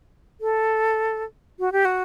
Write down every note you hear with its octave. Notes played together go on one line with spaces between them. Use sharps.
A4
F#4
G4
F#4